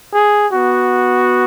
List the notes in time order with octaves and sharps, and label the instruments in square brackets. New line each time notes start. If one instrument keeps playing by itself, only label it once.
[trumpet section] G#4
B3 F#4